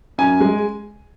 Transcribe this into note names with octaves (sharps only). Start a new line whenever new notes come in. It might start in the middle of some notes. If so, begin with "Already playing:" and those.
F#2 G#5
G#3